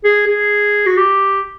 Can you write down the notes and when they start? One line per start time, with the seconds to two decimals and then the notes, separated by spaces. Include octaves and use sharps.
0.04 G#4
0.27 G#4
0.86 F#4
0.97 G4